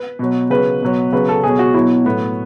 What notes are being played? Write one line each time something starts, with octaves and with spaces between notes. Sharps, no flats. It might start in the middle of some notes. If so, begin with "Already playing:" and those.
Already playing: B4
B2 F#3
C#3 F#3 B4
B2 F#3
C#3 F#3 B4
A4
B2 F#3 G#4
F#4
B2 F#3 E4
A2 F#3 B3